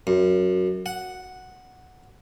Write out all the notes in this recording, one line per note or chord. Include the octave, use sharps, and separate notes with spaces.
F#2
F#5